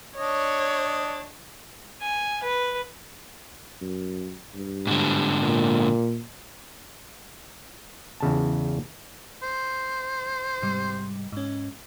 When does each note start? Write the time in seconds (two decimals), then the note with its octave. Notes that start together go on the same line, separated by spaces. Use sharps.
0.17 D4 C#5 D#5
2.02 G#5
2.43 B4
3.81 F#2
4.54 G2
4.87 G#2 D3
5.41 A#2
8.20 E2 C#3 A5
9.43 C5
10.62 G#2 C3 G3
11.32 G#2 C#4